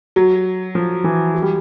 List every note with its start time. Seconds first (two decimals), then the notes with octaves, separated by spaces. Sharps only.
0.16 F#3
0.75 F3
1.04 E3
1.34 F#3
1.42 G3